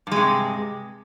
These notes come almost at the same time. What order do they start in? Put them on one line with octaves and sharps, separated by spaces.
G2 G#3 C3